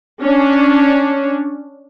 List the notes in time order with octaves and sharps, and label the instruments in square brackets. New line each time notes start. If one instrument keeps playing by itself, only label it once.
[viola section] C#4 D4